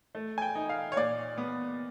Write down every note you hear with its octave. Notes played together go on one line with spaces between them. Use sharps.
A3
G#5
G5
D#4
F5
C#5
A#2 D5
B3